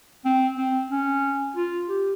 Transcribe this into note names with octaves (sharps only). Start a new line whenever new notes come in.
C4
C4
C#4
F4
G4